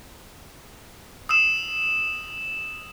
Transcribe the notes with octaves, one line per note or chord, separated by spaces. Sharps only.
D#6 E6 E7